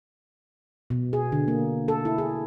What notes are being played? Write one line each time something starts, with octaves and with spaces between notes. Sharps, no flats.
B2
G#4
D3
A#3
A4
E4
G#4